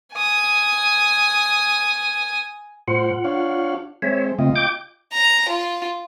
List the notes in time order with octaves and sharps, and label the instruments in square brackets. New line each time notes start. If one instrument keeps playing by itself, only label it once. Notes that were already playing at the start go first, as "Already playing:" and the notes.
[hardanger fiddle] G#5 D#6
[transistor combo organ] A2 C5 [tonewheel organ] F4 F#5
[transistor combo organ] D4 C#5 F5
[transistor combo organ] G#3 C4 [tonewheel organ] C#5 E5
[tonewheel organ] C#3 A3 C4 [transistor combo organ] F4 D#5
[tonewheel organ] G5 D6 G6
[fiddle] A#5
F4